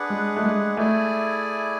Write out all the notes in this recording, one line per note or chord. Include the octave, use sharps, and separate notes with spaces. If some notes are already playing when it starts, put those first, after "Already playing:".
Already playing: D4 G#4 B4 F#5
G#3
A3
G#3
A3 E4 G#4 D5 G#5